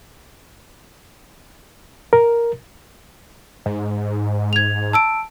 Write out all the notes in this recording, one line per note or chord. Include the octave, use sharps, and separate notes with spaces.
A#4
G#2
G#6 F7
A5 E6 D7